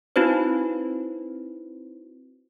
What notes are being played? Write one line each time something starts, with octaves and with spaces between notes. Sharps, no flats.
C4 D#4 E4 F#4 B4 C5